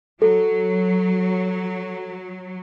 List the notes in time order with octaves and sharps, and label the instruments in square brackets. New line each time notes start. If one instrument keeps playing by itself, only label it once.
[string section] F#3 [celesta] A4